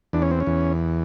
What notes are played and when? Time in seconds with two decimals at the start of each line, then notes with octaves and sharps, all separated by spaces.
0.13 E2 D4
0.22 C#4
0.31 C4
0.40 C#4
0.47 E2